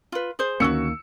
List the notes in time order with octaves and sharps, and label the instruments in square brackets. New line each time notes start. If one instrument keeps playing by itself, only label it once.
[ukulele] F4 B4
G#4 C5
[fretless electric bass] D2 D#3 A#3 [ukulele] C#4 F#4 [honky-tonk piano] E6 C#7